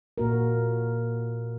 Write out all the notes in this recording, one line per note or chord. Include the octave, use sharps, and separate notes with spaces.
A#2 A#3 F#4 A#4